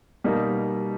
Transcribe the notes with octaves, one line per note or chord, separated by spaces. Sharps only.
B2 G3 A#3 D#4